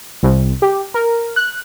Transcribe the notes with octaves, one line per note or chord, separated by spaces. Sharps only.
C2
G4
A#4
F#6